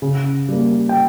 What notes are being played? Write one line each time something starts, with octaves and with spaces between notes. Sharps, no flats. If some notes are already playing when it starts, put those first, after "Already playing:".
C#3
G3 A#3
G5